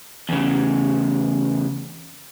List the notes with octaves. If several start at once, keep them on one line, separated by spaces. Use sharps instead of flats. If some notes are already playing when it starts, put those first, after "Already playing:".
E2 C#3